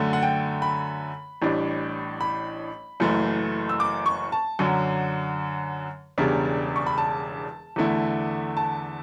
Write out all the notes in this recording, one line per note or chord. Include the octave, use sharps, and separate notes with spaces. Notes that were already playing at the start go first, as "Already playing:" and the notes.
Already playing: F#2 D3 A3
F#5
G5
B5
A1 A2 G3 D4
B5
F#1 F#2 E3 A3
E6
D6
C#6
A5
F#2 D3 F#3
E1 E2 C#3 G3 D4
C#6
B5
A5
E2 D3 A3 E4
A5